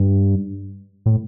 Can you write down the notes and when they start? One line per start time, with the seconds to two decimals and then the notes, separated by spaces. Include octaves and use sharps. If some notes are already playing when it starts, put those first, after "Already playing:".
Already playing: G2
1.06 A2